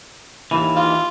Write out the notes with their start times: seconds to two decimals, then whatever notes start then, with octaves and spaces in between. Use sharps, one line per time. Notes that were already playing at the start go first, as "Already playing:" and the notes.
0.51 D#2 E3
0.76 F4